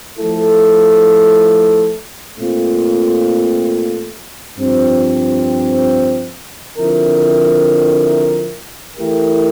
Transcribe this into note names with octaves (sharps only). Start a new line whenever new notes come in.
F3 A3 E4 A4
A#2 A3 C4 F4
G2 F3 C4
D3 F3 C4 E4 A#4
E3 A3 E4 G4 A#4